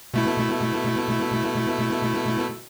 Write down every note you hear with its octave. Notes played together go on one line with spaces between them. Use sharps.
B2 A3 E4